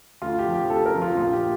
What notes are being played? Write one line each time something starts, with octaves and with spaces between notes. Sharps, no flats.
D2 F4
G4
C3 F3
G4
D2 A4
A#4
C3 F3
F4
A#1 F4
G4